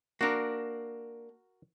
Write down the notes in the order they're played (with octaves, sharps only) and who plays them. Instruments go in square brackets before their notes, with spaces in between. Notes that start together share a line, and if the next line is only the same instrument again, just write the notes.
[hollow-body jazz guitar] A#3 D4 [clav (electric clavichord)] F#4 A#4